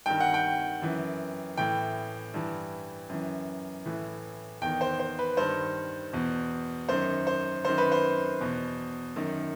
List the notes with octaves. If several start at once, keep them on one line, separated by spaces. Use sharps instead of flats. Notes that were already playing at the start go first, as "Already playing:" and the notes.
G2 D#3 G5
F#5
G5
F#2 E3
A2 E3 G5
G2 E3
F#2 E3
A2 E3
E2 D#3 G5
C5
C5
B4
G2 D#3 C5
E2 B2
F#2 D#3 C5
C5
F#2 D#3 C5
B4
C5
E2 B2
F#2 D#3